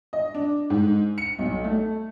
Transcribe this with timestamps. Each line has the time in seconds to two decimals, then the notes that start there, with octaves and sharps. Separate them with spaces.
0.13 D#5
0.34 D4
0.70 G#2
1.18 C#7
1.39 B1
1.64 A3